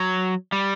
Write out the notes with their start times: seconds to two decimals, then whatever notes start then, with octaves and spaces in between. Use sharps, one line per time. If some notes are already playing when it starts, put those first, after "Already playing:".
Already playing: F#3
0.52 G3